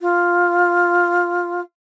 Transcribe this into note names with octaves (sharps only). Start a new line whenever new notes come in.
F4